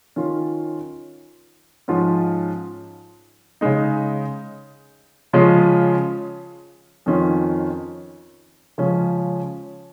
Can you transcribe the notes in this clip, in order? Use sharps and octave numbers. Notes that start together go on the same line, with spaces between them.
D#3 C#4 F4
G#2 F3 C#4 F4
C#3 G#3 D#4
C#3 F3 G#3 C#4 F4
F2 D#3 C#4 F4
C#3 F3 G#3 C#4